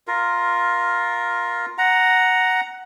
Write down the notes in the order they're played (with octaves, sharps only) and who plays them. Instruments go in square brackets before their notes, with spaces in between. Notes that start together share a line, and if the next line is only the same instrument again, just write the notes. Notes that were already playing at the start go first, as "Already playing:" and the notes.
[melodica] F4 A#4
F#5 A#5